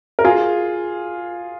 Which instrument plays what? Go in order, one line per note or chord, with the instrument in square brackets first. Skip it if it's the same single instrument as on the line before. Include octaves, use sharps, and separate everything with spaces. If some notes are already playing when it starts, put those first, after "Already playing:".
[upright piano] A#4
F4 G#4